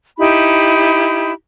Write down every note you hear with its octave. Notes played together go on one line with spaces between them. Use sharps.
D#4 E4 G4 B5